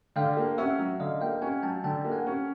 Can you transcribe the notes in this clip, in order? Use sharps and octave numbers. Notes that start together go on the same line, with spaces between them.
D3 F5 G5
A#3
C#4 E5 F#5
F#3
D3 D#5 F5
A#3 F5 G5
C#4 F#5 G#5
F#3 G5 A5
D3 G5 A5
A#3
F#5 G#5
C#4